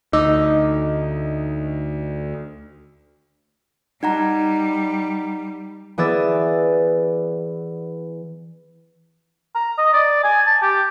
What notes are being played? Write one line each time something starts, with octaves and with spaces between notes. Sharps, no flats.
D2 D#4 D#5 D6 E6
G3 D#4 F#5 A#5
E3 B3 G#4 D5 E6 A6
A#5
D#5
D5
G#5
A5
G4